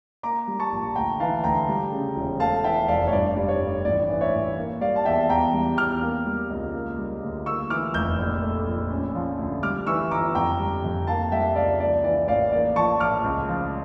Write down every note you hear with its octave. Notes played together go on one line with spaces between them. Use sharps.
A#3 A#5 D6
G3
A5 C#6
A#1
D2 G5 A#5
E3 F5 A5
D2 G5 A#5
G3
C#3
E1
A3 F5 A5
E3 E5 G5
F1 D5 F5
C#5
G2 D5
G3
C#5
G2
A1 D5
E3
C#5 E5
A1
A#3
G3 D5 F5
A5
E2 E5 G5
E2 G5 A#5
G3
E2 D6 F6
A#3
G3
C#2
A#3
G3
D2
A#3 C#6 E6
E3 D6 F6
F1 E6 G6
A#1
A3
A#1
C#4
F3
D2
G3 D6 F6
E3 C#6 E6
G1 A#5 D6
F2 G5 A#5
G3
F2
A#3 F5 A5
G3 E5 G5
C#2 D5 F5
A#3 D5
E3 D5
A1 D5 F5
A#3 D5
F3 A5 C#6
A#1 D6 F6
C#2
F3